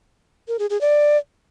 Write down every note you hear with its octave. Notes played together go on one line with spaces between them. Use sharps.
A#4
G#4
G#4
D5